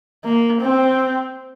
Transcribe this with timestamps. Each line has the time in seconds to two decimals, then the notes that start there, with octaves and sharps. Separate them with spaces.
0.25 A#3
0.61 C4